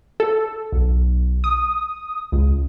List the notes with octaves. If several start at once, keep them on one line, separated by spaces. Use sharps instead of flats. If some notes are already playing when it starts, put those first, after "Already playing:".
A4
B1
D#6
C#2